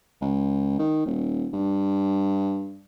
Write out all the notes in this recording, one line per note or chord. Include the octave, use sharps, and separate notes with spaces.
C#2
D#3
D#1
G2